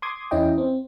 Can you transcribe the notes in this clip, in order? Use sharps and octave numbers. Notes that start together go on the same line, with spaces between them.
C6 D6 D#6 G#6
E2 C#4 E4 D#5 G5
C4